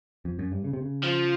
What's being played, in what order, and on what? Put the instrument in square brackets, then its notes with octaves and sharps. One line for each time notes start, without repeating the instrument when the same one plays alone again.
[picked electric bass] F2
F#2
G2
C#3
C3
C#3
[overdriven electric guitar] F3